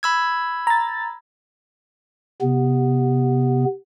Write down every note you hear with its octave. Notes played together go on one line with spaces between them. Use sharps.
B5 E6 G#6
A#5 A6
C3 B3